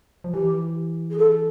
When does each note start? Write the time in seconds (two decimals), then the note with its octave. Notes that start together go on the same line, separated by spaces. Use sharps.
0.24 F3
0.34 E3 G4
1.10 G#4
1.18 A4